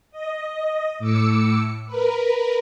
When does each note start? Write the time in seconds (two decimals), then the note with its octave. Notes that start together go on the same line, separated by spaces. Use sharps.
0.11 D#5
0.99 A2 D6 E6 C#7
1.87 A#4 B4